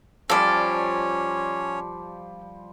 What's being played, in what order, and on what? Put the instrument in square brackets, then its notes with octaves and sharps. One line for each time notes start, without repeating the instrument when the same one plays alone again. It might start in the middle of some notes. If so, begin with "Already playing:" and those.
[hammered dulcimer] F3 G3 [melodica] C#4 C#5 [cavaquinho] A4 D5